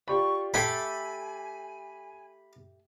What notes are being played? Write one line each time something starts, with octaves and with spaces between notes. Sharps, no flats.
F4 G4 D5 B5 C#6
A3 G4 A4 G#5 B5 G#6 C7